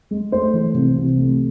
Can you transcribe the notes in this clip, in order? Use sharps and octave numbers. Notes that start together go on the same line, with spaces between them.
G#3
A3 C5
E3
C2
C3
A3